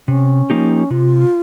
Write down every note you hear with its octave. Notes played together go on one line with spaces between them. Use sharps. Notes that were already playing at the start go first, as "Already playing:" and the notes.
C3 C#4
F3 A#3 D#4 G4
C3 F4